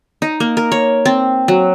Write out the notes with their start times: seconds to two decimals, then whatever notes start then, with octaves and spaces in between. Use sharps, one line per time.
0.22 D#4
0.40 A#3
0.57 A#4
0.72 C#5
1.05 C4
1.48 F#3